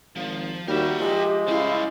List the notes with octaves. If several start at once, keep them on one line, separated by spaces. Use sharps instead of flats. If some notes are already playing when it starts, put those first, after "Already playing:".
G#1 F3
D#2 G3 F#4 A#4 E5
F3 G#3 G4
C#3 G3 E4 F5